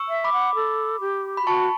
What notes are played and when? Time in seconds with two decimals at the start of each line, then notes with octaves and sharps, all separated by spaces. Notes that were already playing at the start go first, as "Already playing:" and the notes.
Already playing: C#6 E6
0.09 E5
0.24 B5 D6
0.33 F#5
0.55 A4
1.01 G4
1.37 B5
1.43 G4
1.47 F#4 A5 C#6